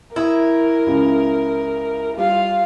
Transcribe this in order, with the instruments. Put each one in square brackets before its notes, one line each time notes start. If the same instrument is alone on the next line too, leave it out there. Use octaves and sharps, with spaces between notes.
[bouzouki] E4 [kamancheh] A#4 [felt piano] D#6 G#6
[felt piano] C#2 C#3
[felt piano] G3 [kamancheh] F4 F5